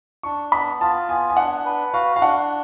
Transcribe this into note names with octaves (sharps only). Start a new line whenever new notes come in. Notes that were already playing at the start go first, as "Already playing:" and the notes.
D4 C#6
B3 B5
F4 A5
B3 G#5
G#5
D4 F#5
B4
F#4 F5
F5
D4 F#5